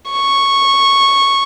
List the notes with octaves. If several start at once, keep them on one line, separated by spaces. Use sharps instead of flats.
C#6